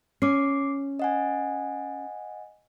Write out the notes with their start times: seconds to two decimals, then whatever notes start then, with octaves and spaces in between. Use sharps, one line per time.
0.22 C#4 D6 C7
0.99 D#5 F#5 G#5